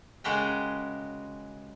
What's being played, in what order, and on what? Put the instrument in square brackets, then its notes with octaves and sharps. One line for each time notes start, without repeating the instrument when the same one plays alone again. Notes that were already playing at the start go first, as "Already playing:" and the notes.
[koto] C#3 G#3 F#4 G4 A#4 G5